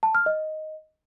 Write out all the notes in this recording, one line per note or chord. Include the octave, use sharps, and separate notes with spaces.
A5
F6
D#5